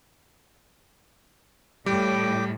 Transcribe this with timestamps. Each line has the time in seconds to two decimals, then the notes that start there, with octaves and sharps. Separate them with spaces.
1.86 A2 G3 G5 D6